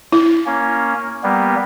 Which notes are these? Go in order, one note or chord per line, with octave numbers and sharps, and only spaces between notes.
E4
A#3 C#4
G3 A#3 B3